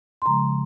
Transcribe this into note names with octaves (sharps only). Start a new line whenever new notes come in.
C6
C#3 F3 G#3 A#5